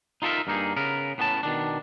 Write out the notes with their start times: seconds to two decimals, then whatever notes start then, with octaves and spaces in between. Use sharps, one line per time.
0.22 D#4 F4 A4 A#4 E5
0.47 G2 A#3 D#4 G#4
0.76 C#3 B3 A#4
1.18 A2 B3 C#4 D5 A5
1.43 B2 D#3 D4